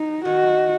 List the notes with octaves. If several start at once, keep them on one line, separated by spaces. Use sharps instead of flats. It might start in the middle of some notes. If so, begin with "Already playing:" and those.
Already playing: F#3 D#4
D#3 F#4